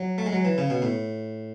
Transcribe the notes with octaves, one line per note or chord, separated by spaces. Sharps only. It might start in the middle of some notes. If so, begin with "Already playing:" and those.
Already playing: F#3
A3
G#3
F#3
E3
C#3
B2
A2